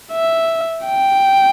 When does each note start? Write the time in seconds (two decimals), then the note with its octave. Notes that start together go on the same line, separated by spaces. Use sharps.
0.12 E5
0.85 G5